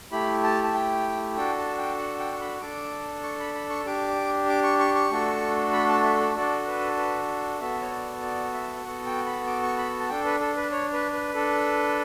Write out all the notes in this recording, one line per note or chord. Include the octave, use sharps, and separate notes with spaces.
A3 E4 G4 B5
A5
A5
G5
D4 F#4 A4 G5
A5
G5
F#5
G5
C#6
B5
D4 A4 D6
C#6
B5
B5
C#6
D4 G4 D6
D6
C#6
C#6
C#6
A3 D4 F#4 A4
B5
A5
E5
D5
D4 F#4 A4 D5
B4
B4
B3 F#4 A4 E5
C#5
D5
D5
E5
B3 F#4 A4 F#5
G5
B5
D6
C#6
B5
A5
D4 A4 G5
B4
A4
B4
C#5
B4
B4
D4 A4